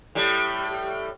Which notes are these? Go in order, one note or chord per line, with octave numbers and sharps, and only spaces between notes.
A2 G3